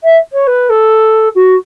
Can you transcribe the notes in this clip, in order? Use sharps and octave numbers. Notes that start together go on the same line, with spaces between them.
E5
C#5
B4
A4
F#4